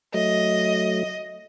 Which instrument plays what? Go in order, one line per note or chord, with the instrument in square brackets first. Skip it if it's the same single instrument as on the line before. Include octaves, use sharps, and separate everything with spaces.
[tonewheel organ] F#3 A3 [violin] D#5